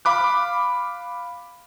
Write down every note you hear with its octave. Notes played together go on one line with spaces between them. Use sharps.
F5 B5 D6 F#6